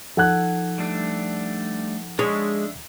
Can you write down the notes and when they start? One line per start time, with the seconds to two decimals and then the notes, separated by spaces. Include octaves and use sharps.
0.17 F3 D#4 A4 F#5 F#6 G#6
0.78 G3 A3 D4
2.19 G#3 D4 C#5 E5